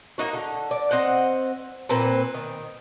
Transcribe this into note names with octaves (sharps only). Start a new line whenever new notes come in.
A#3 D#4 F#4
D3
D5
C4 D#5 F#5
A#2 C4 B4
D#3